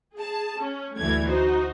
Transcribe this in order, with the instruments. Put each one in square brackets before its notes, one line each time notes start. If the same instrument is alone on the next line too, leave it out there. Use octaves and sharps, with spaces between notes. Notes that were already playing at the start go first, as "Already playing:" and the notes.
[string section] G#4 A5
C#4
D2 E3 G3 A3 G#6
D#4 F#4 C5